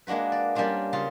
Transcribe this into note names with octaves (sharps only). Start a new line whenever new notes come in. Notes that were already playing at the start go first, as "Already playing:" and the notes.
G#3 A#3 D4 F#4 B4
D5
G3 A#3 C#4 D4 F4
C#3 F4